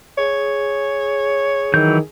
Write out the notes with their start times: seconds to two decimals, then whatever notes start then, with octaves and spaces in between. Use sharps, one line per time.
0.18 G#4 C#5
1.74 D#3 E3 F#3 G6